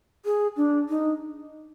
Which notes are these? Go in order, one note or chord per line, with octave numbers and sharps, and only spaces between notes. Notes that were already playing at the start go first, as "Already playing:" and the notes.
G#4
D4
D#4